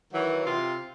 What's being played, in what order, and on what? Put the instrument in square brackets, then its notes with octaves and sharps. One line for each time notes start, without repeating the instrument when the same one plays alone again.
[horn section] D#3 E3 F#3
C3 F4